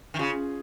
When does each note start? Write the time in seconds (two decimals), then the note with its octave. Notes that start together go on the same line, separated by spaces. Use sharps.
0.14 D#3
0.19 C#3 F4 G#4